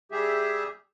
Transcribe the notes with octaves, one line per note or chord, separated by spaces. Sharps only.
G3 G4 G#4 E5